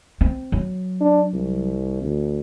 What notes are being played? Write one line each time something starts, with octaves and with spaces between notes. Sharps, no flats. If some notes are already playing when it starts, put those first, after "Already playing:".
C4
F#3
D4
C2
D2